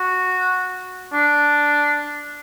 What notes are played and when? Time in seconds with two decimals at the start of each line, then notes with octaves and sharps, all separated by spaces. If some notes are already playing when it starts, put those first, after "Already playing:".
Already playing: F#4
1.12 D4